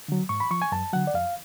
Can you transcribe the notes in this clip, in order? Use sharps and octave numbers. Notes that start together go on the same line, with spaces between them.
D3 F#3
G#2 C#6
B5
F3 C#6
G#5
F#2 A5
D3 F#3 F#5
D5
F2 F5